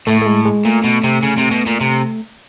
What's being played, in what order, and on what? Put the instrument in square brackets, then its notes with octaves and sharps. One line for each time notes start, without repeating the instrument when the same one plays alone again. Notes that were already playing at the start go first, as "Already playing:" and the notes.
[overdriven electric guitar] A2 [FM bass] A3
[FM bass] A3
G#3
G#3
[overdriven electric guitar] A#2 [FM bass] A3
[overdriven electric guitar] B2
C3
C#3
C3
B2
A#2
C3